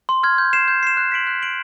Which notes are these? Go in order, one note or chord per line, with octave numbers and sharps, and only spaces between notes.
C6
F6 G#6
G6
C7 E7
G6
C7 E7
F#6
B6 D7 F#7
F#6
B6 D7 F#7